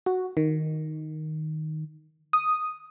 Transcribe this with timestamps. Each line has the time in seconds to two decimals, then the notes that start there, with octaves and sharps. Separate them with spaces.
0.06 F#4
0.37 D#3
2.33 D#6